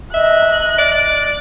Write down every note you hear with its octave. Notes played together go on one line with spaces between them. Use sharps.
D#5 E5 F#6
D5